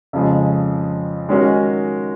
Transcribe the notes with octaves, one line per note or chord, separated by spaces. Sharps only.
F2 C#3 F3 G#3
D#3 G#3 C#4 F#4 A#4